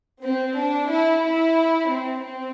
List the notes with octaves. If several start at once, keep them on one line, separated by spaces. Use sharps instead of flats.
C4
D4
E4
E4
C4
C4